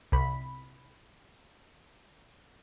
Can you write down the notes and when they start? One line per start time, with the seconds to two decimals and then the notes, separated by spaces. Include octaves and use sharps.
0.12 C2 B5